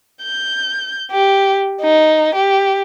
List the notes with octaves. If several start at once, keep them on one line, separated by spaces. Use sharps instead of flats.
G6
G4
D#4
G4